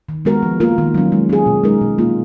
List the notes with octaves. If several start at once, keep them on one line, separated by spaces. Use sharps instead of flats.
D#3
G#3 B3 F#4 A#4
F3
A#3 F4 A#4
D#3
F#3 C#4
G#3
C#4 G#4
B2
G#3 D#4 A#4
B2
A#3 F4